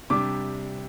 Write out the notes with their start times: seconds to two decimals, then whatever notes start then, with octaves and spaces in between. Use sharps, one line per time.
0.10 C3 G3 D4 D6